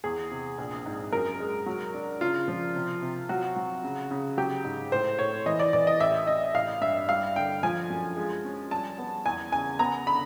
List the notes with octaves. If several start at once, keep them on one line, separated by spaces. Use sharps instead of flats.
E2 G#4
C3
A#1
G#2
F#2 A#4
G#3
F#3
D4
C#3 F4
F3
C3
C3
F#3 F#4
F#3
C#3
C#3
F#3 G4
G#2
A2 C5
A2 C#5
E3 D#5
D5
E3 D5
D#5
A1 E5
A1 D#5
A1 F5
G2 E5
G3 F5
D3 G5
F3 G#5
F#2
G#3
C#4
G3 A5
B3
E2 G#5
C#3 G#5
B3 A#5
D3 B5